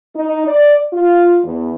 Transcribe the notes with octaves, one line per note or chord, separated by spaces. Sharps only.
D#4
D5
F4
E2